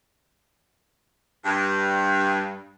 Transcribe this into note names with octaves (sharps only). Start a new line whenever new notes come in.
G2